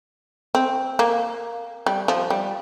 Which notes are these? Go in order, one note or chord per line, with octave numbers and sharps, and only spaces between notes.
C4
A#3
G3
F3
G3